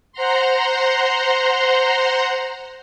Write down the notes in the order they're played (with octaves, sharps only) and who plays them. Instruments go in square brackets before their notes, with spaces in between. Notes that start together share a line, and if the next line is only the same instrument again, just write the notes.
[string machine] C5 F#5 A#5 C6